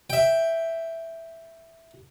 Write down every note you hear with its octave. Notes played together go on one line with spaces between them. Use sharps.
E5 G5